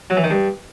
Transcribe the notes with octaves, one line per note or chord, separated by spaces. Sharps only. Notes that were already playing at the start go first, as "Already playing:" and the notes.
F#3
E3
D#3
G2